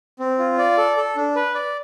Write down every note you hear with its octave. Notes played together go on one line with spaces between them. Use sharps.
C4
F4
D5
A4
A4
D4
B4
D5